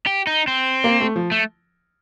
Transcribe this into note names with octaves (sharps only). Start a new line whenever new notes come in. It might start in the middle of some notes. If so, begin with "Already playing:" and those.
G4
D#4
C4
A#3
A3
F3
A3